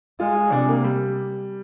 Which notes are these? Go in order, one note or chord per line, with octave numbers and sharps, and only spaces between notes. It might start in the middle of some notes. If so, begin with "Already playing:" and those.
G#3 F4
F4
C3 D4
A#3
G3